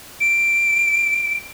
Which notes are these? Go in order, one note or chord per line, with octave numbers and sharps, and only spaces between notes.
D7